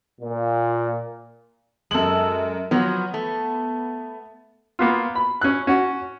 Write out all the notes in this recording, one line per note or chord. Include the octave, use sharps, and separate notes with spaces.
A#2
F#2 G#3 A4 F#7
F3 F#3 B3
A3
A#3 B3 F4
B5
C#4 F#6
C#4 F#4